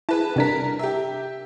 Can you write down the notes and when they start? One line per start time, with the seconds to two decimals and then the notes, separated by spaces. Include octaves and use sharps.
0.09 E4 G#4 B4 A5
0.36 C3 G3 D4 A#4 B6
0.79 G4 E5